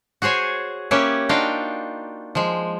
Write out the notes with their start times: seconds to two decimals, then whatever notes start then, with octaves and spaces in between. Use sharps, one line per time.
0.22 F#4 G#4 C5 C#5 G#5
0.91 A#3 C#4 G4 B4 C#5 E5
1.29 D4 D#4 F4 F#4 F5 G5
2.35 F3 G#3